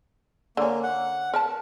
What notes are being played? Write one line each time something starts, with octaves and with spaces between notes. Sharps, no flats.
D3 A#3 C#4
F#5
A#4 B4 A5